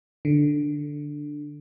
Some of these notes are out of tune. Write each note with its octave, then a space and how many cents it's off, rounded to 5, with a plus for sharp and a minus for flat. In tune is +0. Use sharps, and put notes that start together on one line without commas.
D3 +5